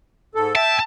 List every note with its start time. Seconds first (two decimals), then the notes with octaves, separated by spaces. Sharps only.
0.35 G#2 A4
0.55 E5 G5 A5